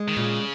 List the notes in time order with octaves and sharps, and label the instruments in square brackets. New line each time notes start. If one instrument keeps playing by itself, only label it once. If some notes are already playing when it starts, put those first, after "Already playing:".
Already playing: [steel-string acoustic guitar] G#3
[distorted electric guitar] D#3
[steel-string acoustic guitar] A#2 [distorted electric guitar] C#3